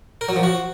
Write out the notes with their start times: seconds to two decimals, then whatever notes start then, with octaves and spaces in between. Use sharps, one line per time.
0.21 A#4
0.29 F#3
0.36 F3
0.43 F#4